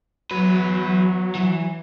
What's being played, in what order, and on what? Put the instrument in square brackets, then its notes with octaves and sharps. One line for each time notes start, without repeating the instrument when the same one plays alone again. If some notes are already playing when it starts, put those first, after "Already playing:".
[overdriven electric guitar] E2 B4 [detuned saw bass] F#3
[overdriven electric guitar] E3